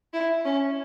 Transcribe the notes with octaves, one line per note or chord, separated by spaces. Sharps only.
E4
C#4